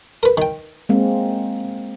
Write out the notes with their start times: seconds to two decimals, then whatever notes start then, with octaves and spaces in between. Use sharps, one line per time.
0.23 A#4 B4
0.37 D#3 G5
0.89 G#3 A#3 C4